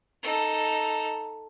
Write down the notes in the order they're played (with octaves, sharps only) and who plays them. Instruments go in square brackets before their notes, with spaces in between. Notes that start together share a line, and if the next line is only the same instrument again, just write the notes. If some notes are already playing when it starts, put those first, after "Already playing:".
[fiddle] D#4 A4